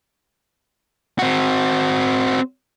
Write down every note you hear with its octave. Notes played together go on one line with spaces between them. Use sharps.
C4 F#4